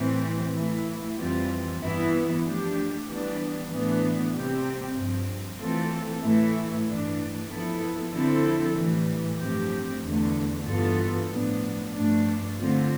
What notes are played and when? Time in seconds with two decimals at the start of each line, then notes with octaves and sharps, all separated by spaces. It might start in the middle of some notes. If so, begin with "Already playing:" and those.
Already playing: A2 E3 G3 C4
0.54 E3 A3 E4
1.17 F2 E3 G3 C4 F4
1.80 G2 E3 B3 E4
2.44 F3 A3 D4 G4
3.07 E3 G3 B3 D4
3.70 A2 E3 B3 D4
4.33 C3 G3 C4 G4
4.96 G2 F3 C4
5.60 E3 A3 C4 F4 A4
6.23 A2 E3 A3 E4
6.87 G2 E3 A3 D4
7.50 F3 B3 E4 A4
8.13 D3 F3 C4 E4 A4
8.76 A2 E3 G3
9.39 G2 F3 A3 C4 G4
10.03 E2 D3 A3
10.66 G2 E3 B3 F4 A4
11.29 A2 F3 B3 D4
11.92 G2 F3 A3 D4
12.55 D3 A3 C4 F4